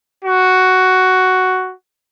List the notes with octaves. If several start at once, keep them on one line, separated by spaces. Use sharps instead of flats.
F#4